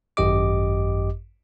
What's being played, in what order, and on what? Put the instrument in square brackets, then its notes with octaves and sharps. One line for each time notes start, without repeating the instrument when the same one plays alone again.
[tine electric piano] G#1 F#2 G4 D#5 D6